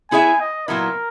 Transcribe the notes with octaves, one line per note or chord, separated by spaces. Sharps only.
B3 E4 G#4 C#5 E5 G#5
D#5
A#2 F#3 B3 E4 A#4